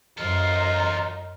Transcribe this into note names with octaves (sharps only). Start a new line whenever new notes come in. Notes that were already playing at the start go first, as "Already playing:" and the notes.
F#2 D#4 F4 A4 C5